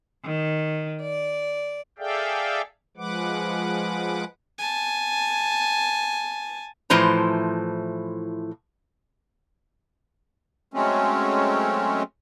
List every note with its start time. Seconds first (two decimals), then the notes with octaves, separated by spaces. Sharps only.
0.24 D#3
1.01 D5
1.99 G#4 A4 D5 E5 F5 G5
2.97 F3 G#3 B4 F#5 D6
4.59 G#5 A5
6.90 A2 E3 F3 C5 A#5
10.74 F#3 G#3 A3 C4 C#4